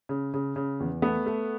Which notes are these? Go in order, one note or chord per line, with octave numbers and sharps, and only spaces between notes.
C#3
C#3
C#3
E2
A3 B3
A3